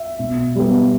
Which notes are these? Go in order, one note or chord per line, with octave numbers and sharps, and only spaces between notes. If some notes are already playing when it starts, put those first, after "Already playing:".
Already playing: E5
B2
G3 B3